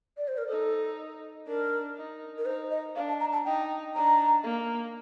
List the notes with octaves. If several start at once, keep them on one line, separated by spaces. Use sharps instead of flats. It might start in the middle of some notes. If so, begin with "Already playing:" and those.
D5
C5
A#4
D#4 A4
D4 A#4
D#4
A#4
D#4 C5
D#5
D4 F5
A5
A#5
A5
D#4 G5
D4 A#5
A#3